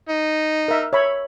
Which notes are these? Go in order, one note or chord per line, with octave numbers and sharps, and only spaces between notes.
D#4
A#4 E5
C#5 E5 B5